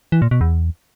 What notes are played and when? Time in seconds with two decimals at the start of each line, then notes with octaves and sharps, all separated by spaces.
0.12 E3
0.22 A#2
0.31 B2
0.41 E2